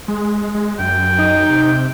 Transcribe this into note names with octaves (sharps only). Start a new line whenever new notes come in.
G#3
G#3
F#2 G5
D#4
C3